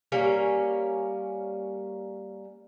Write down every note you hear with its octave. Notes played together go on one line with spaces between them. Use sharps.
G3 A#3 C#4 A#4